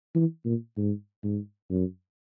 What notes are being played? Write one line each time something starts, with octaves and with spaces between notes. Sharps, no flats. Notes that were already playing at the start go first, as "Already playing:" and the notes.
E3
A#2
G#2
G#2
F#2